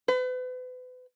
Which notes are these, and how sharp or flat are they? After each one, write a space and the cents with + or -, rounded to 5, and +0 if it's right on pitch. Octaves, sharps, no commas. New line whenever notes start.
B4 +35